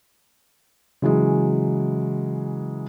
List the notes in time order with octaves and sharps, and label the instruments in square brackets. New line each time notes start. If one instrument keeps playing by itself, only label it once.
[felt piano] C#3 E3 F#3 G#3